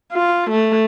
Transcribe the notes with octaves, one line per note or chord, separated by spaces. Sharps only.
F4
A3